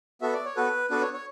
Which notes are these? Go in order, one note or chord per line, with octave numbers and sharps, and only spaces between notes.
B3 F#4 A4 E5
D5
C#5
B3 F#4 A4 B4
B3 D4 F#4 A4 B4
C#5
C#5